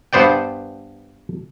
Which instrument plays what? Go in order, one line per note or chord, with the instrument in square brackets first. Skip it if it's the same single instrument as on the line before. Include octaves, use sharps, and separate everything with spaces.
[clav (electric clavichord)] G2 B3 C5 D5 G5